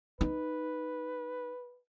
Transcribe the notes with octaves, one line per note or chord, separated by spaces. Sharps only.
D#4 B4